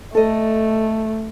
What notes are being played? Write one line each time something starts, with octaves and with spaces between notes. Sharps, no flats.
A3 A4 D#5